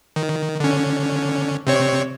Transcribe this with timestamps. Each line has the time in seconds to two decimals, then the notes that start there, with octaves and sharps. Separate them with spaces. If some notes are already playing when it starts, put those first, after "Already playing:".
0.16 D#3
0.60 D3 C#4
1.67 C3 C4 C#5